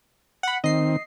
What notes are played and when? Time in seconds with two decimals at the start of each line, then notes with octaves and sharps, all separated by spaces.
0.43 F#5 B5
0.64 D#3 C4 D#5 C7